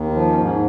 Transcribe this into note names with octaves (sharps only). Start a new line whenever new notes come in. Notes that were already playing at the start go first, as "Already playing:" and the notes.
Already playing: D#2
F3
C#4
G#2
C#4